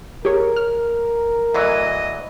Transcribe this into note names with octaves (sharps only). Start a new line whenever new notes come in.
G4 G#4 A#4 C#5
F6
D2 E3 F#3 D#5